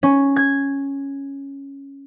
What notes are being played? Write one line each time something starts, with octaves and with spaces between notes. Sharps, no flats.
C#4
G#6